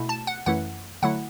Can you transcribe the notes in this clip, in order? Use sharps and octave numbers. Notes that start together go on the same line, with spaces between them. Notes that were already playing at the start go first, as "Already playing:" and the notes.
Already playing: B2 A3 E4
A5
F#5
F#2 E3 A3 E4 F#5
D3 F#3 A3 E4 F#5